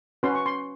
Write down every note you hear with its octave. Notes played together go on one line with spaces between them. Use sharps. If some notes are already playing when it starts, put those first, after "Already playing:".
C#4 F#4 B4 C6
C#6
C6